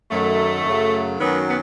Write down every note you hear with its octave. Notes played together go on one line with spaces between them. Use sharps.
F#2 D#3 F#3 A3
F#2 C#3 F#3
F#2 D#3 F#3 B3
B3